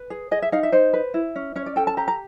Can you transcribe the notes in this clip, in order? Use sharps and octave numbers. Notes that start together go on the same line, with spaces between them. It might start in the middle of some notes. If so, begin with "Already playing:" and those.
Already playing: B4
G#4
G#4 D#5
E5
D#4 F5
E5
D#4 C5
B4
E4
C#4
C#4 C#5
D5
A4 G5
A5
G4 A#5
A#5